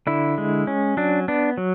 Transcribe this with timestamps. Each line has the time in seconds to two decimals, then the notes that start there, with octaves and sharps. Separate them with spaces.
0.07 D3 E4
0.38 G#3
0.67 C#4
0.97 F#3 D4
1.28 B3 D4
1.57 F#3